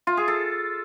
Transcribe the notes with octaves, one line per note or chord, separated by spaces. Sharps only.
F4
G#4
A4